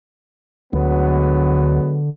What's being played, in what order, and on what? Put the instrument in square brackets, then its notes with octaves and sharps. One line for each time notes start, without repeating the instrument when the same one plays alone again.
[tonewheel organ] D2 [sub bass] D3 [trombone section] F#3 G#3 B3